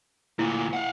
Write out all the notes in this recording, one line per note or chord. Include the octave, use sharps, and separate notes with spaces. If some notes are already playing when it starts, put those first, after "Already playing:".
D2 A#2 E4
F5 F#5